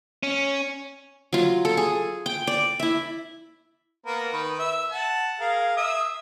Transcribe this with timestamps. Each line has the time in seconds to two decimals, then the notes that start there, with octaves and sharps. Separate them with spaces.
0.23 C#4
1.33 F#3 F4
1.65 A4
1.77 G#4
2.26 G5
2.47 D5
2.80 E4 E5
4.06 A#3 B3 A#4
4.33 D#3 B4
4.59 E5
4.91 F#5 A5
5.40 G#4 A#4 F5
5.77 E5 D#6